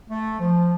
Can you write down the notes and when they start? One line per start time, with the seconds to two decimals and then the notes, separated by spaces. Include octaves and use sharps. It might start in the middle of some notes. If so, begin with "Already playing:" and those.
0.09 A3
0.39 F3